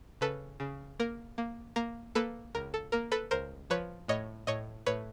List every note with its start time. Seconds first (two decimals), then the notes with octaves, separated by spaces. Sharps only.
0.21 C#3 A4 B4
0.60 C#3
0.99 A#3 A#4
1.38 A#3
1.76 A#3 A#4
2.15 A#3 A4 B4
2.55 C#2 A#4
2.74 A4
2.92 A#3 A#4
3.12 A4 B4
3.31 C#2 A#4 C5
3.70 F3 B4 C#5
4.08 A2 C#5 D#5
4.47 A2 C#5 D#5
4.86 A2 B4 C#5